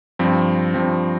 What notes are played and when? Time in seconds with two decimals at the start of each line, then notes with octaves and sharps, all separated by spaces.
0.19 G2 F3 C4
0.74 G2 F3 C4